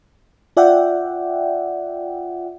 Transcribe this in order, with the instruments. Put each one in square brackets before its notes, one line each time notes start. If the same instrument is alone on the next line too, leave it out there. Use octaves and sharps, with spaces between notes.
[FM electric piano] F4 D5 E5 F#5 G5